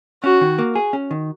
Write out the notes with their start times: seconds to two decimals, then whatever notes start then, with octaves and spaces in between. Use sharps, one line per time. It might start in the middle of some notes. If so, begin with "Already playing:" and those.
0.23 C#4 F#4
0.41 D#3
0.58 A#3
0.75 G#4
0.93 C#4
1.11 D#3